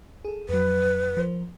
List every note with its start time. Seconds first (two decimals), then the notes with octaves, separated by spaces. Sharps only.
0.25 G#4 A4
0.49 F2 F#3 B4
1.17 F3 A#4 C5